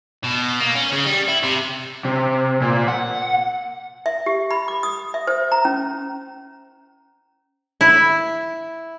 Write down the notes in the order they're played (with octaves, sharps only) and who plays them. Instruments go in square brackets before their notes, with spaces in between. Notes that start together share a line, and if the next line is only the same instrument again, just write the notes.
[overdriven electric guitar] B2
A#3
C#4
C#3
G3
E4
C3
[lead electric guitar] C3
A#2
F#5
[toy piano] E5
G4
B5
D6
D#6
E5
C5
A#5
C#4
[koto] E4